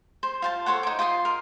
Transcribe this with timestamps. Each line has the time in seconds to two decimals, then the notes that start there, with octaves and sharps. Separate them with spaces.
0.23 C5
0.42 F4 C5 A5
0.66 A4 C5 C#5 F#5
0.83 D#4 D6
0.99 F4 C5 D#5 C6
1.25 A#4